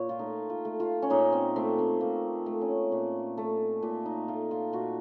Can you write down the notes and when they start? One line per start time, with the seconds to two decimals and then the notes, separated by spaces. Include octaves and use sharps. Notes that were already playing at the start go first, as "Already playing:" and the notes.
Already playing: A#2 C#5
0.09 F4
0.19 A3 D#4
0.50 F4
0.65 A3
0.80 F4
1.02 C#4
1.10 A#2 D#4
1.32 C4
1.56 A3 C4
1.78 C4
2.01 A#2 A#3
2.46 A3
2.61 C#4
2.92 A#2
3.37 A3
3.82 A#2
4.06 D#4
4.28 A3 F4
4.51 F4
4.73 A#2 F#4